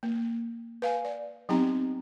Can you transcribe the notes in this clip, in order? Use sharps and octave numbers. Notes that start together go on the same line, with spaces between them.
A#3
B4 F5 G#5
D5
F#3 B3 C4 D#4 G4 A#5